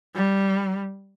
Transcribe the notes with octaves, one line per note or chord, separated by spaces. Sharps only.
G3